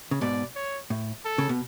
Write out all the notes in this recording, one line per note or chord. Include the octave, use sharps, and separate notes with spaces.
C#3
G#2 B2 D5
C#5
A2
A4
C#3
B2